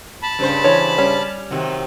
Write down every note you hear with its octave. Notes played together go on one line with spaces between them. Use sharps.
A5 B5
G2 C#3 C5
E3 C#5
G3 C#4
C3 D#3 F#3